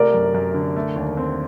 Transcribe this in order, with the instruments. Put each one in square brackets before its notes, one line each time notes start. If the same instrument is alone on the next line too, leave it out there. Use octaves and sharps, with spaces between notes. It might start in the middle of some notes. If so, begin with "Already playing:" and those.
Already playing: [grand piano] C3 A3 [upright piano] A#4 D5
[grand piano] F#2
F#2
D3
A3
D#2
C4